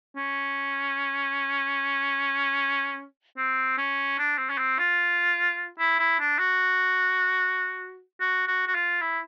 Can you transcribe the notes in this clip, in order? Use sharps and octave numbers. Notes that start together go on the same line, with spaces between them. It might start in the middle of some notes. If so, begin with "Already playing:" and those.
C#4
C4
C#4
D4
C4
C#4
C4
F4
E4
E4
D4
F#4
F#4
F#4
F#4
F4
E4